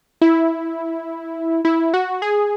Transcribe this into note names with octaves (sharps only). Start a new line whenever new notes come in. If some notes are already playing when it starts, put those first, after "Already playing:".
E4
E4
F#4
G#4